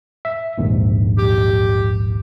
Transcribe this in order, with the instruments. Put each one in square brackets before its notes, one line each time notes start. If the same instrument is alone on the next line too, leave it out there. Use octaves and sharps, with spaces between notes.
[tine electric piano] E5
A#1 D#2 G#2
[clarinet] G4